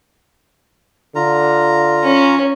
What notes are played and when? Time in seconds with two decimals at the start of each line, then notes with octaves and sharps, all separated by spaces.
1.15 D3 F4 A#5
2.03 C#4